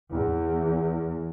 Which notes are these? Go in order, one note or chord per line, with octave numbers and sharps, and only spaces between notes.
E2